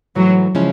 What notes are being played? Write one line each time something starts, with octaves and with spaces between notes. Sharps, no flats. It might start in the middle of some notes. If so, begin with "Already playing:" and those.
G#2 E3 F#3 A3
C#3 F3 G#3 C#4 E4